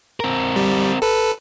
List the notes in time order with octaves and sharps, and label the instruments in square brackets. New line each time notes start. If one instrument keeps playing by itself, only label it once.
[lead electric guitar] C4 A#4
[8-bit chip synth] G3
A4 B4